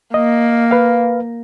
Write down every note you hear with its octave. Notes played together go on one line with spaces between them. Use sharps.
A#3 D#5
B4 F5